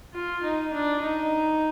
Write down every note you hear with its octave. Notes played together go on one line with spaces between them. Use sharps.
F4
D#4
D4
D#4